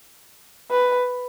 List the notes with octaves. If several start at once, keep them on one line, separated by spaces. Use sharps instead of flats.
B4